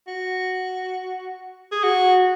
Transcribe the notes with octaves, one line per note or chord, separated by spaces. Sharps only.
F#4
G#4
F#4